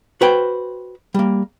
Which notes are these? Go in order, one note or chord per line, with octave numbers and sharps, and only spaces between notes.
F#4 B4 C5 G5
G3 A#3